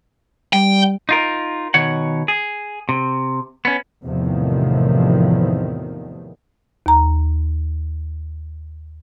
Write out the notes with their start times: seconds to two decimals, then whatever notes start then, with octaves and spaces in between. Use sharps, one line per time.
0.53 G3 G5
1.09 D#4 F4 A#4
1.74 B2 D#3 C#5 F#5
2.28 G#4
2.89 C3
3.65 B3 C#4
4.03 E2 A2 C3 D#3 F3
6.86 D#2 A#5